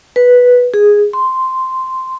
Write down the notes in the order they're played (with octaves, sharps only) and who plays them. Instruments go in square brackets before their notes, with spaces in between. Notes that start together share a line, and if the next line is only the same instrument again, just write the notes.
[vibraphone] B4
G#4
C6